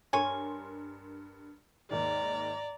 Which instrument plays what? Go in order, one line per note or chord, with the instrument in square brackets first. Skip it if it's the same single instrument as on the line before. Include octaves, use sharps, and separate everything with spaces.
[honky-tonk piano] G2 A#4 C6 [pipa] C#5 G#5
[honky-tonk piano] D#2 G#2 D#3 [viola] D5 A#5